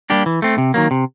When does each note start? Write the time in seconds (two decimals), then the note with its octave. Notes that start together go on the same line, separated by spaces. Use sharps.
0.10 G3 A#3 D4 G4
0.26 E3
0.42 A3 C4
0.58 C3
0.74 D#3 F#3 A#3
0.91 C3